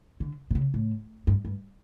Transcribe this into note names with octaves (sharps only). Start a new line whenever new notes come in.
D3
B2
C#3
A2
G2
G2